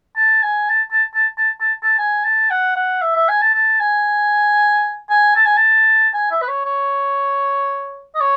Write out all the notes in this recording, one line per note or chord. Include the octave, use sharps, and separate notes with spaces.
A5
G#5
A5
A5
A5
A5
A5
A5
G#5
A5
F#5
F#5
E5
E5
G#5
A5
A5
G#5
G#5
A5
G#5
A5
G#5
E5
B4
C#5
C#5
D#5
C#5